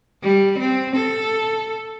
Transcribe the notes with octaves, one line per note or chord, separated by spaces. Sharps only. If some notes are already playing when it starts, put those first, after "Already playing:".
G3
C4
A4